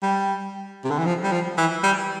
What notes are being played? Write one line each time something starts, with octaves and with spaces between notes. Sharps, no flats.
G3
C3
D3
E3
F3
G3
F3
E3
G3